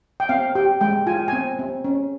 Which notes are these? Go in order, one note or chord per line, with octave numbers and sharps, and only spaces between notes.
G5
C4 F5
G4 G5
G#3 G5
F4 G#5
G5
C4 G#5
C4
C#4